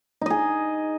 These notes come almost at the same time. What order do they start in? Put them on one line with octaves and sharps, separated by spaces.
D#4 D#5 G#4